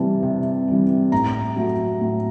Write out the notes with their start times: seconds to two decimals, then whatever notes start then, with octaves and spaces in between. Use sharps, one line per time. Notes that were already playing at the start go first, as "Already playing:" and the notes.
Already playing: C3 E3 G3 A5
0.23 C3
0.68 E3 G3
1.12 A2 A#5
1.56 F#3 A3
2.01 A2